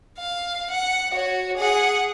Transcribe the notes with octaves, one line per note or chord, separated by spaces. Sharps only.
F5
F#5
F#4 C#5
G#4 F#5